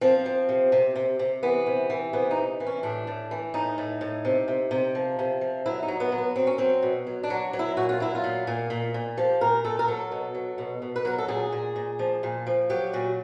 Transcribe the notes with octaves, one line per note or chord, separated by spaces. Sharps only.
F3 C4
F3
C3
C3
C3
C3
E3 B3
C3
E3
C3 B3
D#4
C3
E3
C#4
A2 D4
A2
E3
A2 D#4
A2
A2
C3
C3
C3
F3
C3
F3
F#3 E4
D#4
F#3
B3
F#3
B3
F#3 C4
C#4
F#3 C4
B2
F#3
D4
F#3
F#3
E4
A#2 F#4
F4
F#3 E4
F4
A#2
A#2
A#2
A#2
F3 G4
A#2 A#4
A#2 A4
A#4
F#3 A4
B2
F#3
B2
B2
B4
F#3 A#4
A4
A#2 G#4
A#2
A#2
F3
A#2
F3
F#3 G4
A#2 F#4